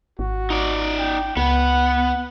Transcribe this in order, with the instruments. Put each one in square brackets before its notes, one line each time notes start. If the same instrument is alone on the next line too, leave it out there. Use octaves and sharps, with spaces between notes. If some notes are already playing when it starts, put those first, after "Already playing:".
[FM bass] G#1 [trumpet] F#4
[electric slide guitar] D#4 D5
[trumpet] G5
[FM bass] C#2 [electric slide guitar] B3 [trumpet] F#5